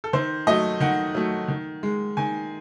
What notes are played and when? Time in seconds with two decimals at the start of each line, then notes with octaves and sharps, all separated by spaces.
0.04 A4
0.13 D#3 C5
0.47 F#3 A3 D#5
0.81 D#3 F#5
1.15 F#3 A3
1.48 D#3
1.83 G#3
2.17 D#3 G#5